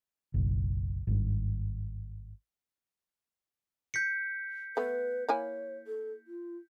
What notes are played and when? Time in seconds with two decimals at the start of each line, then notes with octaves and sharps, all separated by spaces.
0.34 F#1 B1
1.07 G#1 G2
3.94 G6 B6 C#7
4.77 A3 B3 B4
5.29 A#3 E4 C#5 G#5
5.87 A4
6.27 F4